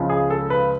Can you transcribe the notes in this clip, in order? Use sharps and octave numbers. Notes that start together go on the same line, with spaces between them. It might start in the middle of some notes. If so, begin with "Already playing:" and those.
Already playing: C#2 C#3 F3 G#3
G#4
A4
B4